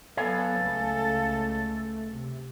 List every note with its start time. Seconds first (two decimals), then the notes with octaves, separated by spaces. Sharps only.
0.17 F#3 B3 A4 C#5 F5 G#5
0.61 C#2 A3
2.11 C3